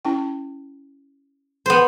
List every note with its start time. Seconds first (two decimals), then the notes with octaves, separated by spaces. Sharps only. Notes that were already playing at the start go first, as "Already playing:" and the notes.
0.05 C#4 E4 G5
1.66 B3 C5